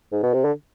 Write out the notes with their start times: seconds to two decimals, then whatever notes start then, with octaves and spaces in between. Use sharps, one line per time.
0.12 G#2
0.23 B2
0.34 C3
0.44 D3